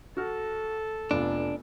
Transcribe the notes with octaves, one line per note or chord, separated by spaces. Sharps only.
F#4 A4 F6
F1 B3 D4 F4